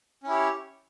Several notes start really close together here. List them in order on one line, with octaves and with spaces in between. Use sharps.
C#4 E4 G4 C#5